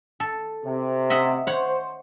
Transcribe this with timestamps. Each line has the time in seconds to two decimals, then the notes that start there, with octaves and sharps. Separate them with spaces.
0.20 A4
0.64 C3
1.10 D#5 E5 F#5
1.47 C5 C#5 F#5